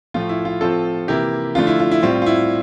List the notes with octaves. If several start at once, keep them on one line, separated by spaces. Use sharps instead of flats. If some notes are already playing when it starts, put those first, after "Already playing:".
A2 F3 A3 F4
E4
F4
A2 F3 C4 F4 A4
C3 E3 A#3 E4 G4
D3 F3 A3 F4
E4
F4
E4
A2 G3 C4 F4
F4
E4